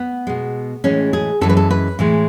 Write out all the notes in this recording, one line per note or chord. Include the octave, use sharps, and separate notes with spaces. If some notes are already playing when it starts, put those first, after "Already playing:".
Already playing: B3
B2 G#3
A2 E3 G#3 C#4
G#4
F#2 E3 G#3 A4
B4
A4
B4
A2 E3 G#3